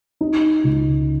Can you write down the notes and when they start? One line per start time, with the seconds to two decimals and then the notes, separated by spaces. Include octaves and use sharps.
0.21 D#4
0.64 C#2